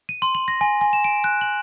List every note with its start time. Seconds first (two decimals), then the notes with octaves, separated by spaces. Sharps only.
0.09 D#7
0.22 C6
0.35 F#7
0.48 A#6
0.61 G#5
0.81 G#5
0.93 E7
1.04 D7
1.24 F#6
1.41 F#7